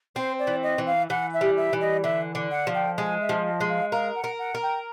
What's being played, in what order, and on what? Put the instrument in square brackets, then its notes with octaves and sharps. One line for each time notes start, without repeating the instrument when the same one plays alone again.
[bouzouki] C4 [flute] C5
[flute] D5
[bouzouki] E3
[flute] D#5
[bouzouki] E3
[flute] F5
[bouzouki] E3 [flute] F#5
[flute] E5
[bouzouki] G3
[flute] E5
[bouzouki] E3
[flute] D#5
[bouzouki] D3 [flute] E5
[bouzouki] D3
[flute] F#5
[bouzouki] F3
[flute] G5
[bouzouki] G#3 [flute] G#5
[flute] E5
[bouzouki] F3
[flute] D#5
[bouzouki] G#3
[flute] F5
[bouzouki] A#4 [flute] F5
[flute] F#5
[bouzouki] A#4
[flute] F#5
[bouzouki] A#4
[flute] G5